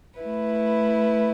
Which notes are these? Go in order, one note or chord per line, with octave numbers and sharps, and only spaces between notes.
A3 E4 B4